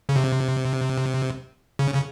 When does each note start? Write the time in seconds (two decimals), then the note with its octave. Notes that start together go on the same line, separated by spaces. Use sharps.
0.09 C#3
0.16 C3
1.79 C#3
1.94 C#3